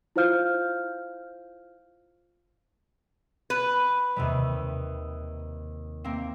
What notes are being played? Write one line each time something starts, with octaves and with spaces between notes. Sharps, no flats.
E4 F4 C5 F5 F6 G6
B4
D#2 C3 G3
A#3 C4